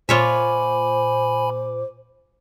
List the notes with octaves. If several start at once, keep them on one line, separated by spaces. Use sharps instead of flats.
A#2 F4 C5 C#5 E5 G#5 B5 D6